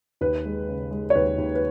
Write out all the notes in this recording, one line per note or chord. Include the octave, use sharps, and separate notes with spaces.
D#2 B4
G#3
C#3
G#3
C#5
D#2 B4
D#2
B4